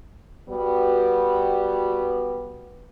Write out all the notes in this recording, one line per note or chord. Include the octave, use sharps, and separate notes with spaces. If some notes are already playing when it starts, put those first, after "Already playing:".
G3 B3 F#4